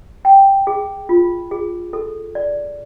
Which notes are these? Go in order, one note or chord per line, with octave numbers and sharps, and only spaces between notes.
G5
G#4
F4
G#4
A4
D5